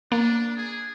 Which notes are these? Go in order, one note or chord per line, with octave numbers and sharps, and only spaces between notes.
A#3 D4
G#4